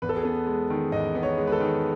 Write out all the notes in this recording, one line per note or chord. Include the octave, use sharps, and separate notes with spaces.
E2 B4
A4
G#4
B3 A4
G#3
D#3
E2 D#5
B3
C#5
G#3
B4
A4
D#3